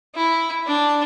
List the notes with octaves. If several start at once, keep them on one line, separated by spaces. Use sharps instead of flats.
E4
D4